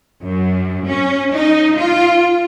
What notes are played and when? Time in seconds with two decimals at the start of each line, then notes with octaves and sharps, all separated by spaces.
0.23 F#2
0.87 C#4
1.33 D#4
1.77 F4